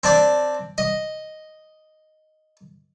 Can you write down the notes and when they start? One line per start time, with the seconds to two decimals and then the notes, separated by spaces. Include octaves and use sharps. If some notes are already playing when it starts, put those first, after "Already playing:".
0.04 C4 D4 D5
0.78 D#5